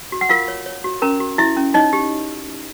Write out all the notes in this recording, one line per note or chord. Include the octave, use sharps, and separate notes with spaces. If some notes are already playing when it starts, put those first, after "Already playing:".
F#4
F#5
F4 A#4 F5
C#5
C#5
F#4
C#4 A#4 A#5
F#4
E4 F#4 E5
C#4
D#4 C#5 D#5
G4